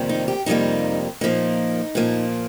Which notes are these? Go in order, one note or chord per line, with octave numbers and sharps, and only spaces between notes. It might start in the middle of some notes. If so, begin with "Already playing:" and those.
Already playing: F2 C3 D#3 G3 A#3
D#4
G4
F2 C3 D#3 G3 A#3 D#4
A#2 F3 A#3 D#4
A#2 F3 A#3